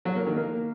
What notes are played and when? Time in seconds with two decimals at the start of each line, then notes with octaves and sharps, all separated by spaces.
0.05 F#3
0.16 A#3
0.26 D#3
0.37 A#3